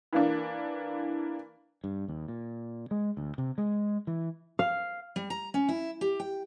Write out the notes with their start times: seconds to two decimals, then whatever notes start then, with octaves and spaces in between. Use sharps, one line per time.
0.13 E3 A#3 D4
1.84 G2
2.08 D#2
2.28 A#2
2.91 G#3
3.17 D2
3.38 C3
3.58 G#3
4.07 E3
4.59 F5
5.16 G3
5.30 A#5
5.54 C#4
5.69 E4
6.01 G4
6.20 G5